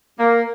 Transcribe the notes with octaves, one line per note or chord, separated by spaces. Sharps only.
A#3